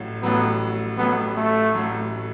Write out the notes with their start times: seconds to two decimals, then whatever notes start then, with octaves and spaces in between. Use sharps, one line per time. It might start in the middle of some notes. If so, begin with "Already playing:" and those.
Already playing: A1 A2 F#3
0.22 A1 A2 F#3 B3
0.99 A1 A2 F#3 B3
1.37 A3
1.74 A1 A2 F#3